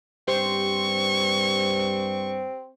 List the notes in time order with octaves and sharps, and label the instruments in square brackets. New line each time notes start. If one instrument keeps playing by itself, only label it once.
[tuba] G2 [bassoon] C4 [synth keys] G4 C5 C6 [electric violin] C#6